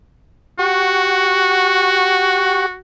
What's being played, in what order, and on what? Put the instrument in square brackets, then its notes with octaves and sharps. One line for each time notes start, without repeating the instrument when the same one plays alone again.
[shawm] F#4 [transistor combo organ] G4 F#5 C#6